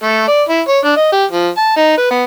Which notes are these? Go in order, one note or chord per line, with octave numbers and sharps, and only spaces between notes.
A3
D5
E4
C#5
D4
D#5
G4
F3
A5
D#4
B4
B3